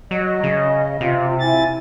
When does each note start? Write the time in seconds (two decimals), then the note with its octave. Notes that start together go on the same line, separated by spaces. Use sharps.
0.11 F#3 D#5
0.43 C#3
1.01 C3 F4
1.40 E4 G#5 A6